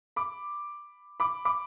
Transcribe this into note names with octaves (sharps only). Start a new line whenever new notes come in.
B5 D6
B5 D6
B5 D6